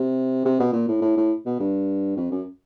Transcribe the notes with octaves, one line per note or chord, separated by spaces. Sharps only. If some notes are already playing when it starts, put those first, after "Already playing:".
Already playing: C3
C3
B2
A#2
A2
A2
A2
B2
G2
F2
F#2